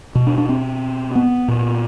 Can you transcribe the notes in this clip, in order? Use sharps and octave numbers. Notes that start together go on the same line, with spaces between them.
B2
D4
D4
C4
B3
A#2